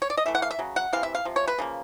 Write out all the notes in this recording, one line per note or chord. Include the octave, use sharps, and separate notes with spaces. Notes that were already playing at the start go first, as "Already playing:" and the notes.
C#5
D5
D#5
E3 A3 E5
F#5
F5
E5
C#3 F#3
F#5
C3 E3 F5
E5
F5
C3 F3
C#5
B4
C#3 F3 A#3